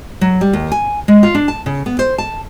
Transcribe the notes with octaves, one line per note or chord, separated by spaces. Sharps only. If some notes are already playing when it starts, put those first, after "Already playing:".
F#3
G3
D#2
G#5
G#3
F4
D4
A5
C#3
B3
C5
A5